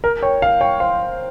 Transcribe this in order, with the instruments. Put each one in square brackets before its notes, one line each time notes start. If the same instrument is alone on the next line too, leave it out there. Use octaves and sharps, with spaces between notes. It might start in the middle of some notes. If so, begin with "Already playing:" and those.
[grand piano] A#4
[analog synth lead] C#5 [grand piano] G5
[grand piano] F5
[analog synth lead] C#5 [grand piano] G5
[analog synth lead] C5 [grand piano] F5